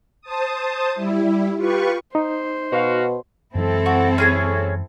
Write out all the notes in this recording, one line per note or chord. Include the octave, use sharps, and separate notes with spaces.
C5 A5 D#6
G3 E4
F4 G4 B4 C#6
D#4 C5
B2 F#4 F5
F#2 E3 G#3 C4 E4 A4
F#4
C#4 G#4 C#5